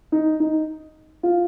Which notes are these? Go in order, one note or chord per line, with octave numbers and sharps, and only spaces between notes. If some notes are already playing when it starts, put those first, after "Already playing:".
D#4
D#4
F4